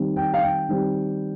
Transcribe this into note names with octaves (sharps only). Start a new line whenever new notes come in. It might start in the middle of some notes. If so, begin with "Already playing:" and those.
Already playing: D#3 G3 C4
G5
F5
G5
D#3 G3 C4